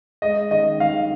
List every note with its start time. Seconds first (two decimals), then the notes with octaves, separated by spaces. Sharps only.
0.22 G#3 D#5
0.51 D#3 D#5
0.80 D#3 F5